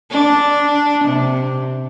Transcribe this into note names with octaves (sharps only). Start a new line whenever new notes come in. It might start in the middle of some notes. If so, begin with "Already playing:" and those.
D4
C3